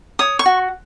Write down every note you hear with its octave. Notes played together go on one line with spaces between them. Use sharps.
C#5 D#6
C#6
F#4